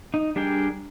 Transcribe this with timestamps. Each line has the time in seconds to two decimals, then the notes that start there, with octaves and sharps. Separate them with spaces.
0.14 D#4
0.36 G3 D4 G#4 A#4 G5